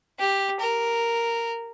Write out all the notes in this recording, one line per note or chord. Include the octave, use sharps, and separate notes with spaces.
G4
A#4